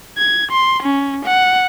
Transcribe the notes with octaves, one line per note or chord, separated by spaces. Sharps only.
G#6
C6
C#4
F#5